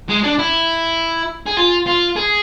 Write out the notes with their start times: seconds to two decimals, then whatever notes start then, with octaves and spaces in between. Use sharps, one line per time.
0.09 G#3
0.24 D4
0.39 E4
1.46 G#4
1.57 F4
1.86 F4
2.16 G#4